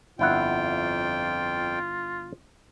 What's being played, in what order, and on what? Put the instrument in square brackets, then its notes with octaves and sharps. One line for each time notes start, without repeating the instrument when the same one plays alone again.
[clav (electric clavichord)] G1 E4 F#5 [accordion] F2 G5 [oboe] F4